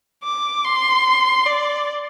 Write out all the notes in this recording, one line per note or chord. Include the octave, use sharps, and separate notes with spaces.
D6
C6
D5